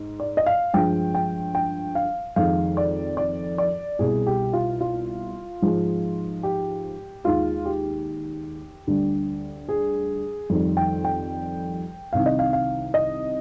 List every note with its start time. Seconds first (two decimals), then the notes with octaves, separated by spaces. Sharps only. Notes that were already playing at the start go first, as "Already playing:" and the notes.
Already playing: G#2
0.20 D5
0.37 D#5
0.46 F5
0.73 G2 F3 G#3 G5
1.15 G5
1.55 G5
1.95 F5
2.36 F2 D#3 G#3 F5
2.77 D5
3.17 D5
3.58 D5
3.99 C2 B2 G3 G#4
4.27 G4
4.53 F4
4.81 F4
5.62 G#2 F3 G#3
6.43 G4
7.24 D#2 D#3 G#3 F4
7.65 G4
8.87 D2 D3 G3
9.69 G#4
10.50 F2 D#3 G3
10.77 G5
11.05 G5
12.13 C2 C3 D#3 F5
12.26 D#5
12.39 F5
12.53 F5
12.94 D#5